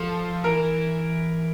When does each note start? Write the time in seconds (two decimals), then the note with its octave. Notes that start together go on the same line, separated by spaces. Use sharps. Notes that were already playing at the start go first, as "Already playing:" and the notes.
Already playing: F3 A4
0.44 E3 A#4